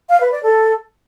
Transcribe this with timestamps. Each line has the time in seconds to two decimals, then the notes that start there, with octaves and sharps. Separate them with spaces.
0.09 F5
0.20 B4
0.32 D5
0.43 A4